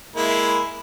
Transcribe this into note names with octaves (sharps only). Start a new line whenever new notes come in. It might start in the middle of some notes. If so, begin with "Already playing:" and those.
G#3 A#3 E4